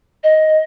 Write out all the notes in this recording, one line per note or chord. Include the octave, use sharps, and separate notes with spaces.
D#5